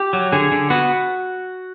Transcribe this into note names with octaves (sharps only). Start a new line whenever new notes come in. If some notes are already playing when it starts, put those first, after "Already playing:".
Already playing: G4
F#3
D3 G#4
D3
B3 F#4